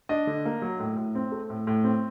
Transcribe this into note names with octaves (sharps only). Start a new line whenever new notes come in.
D4 D#5
D3
A#3
F#3
A2
A2
C4
A3
A2
A2
C4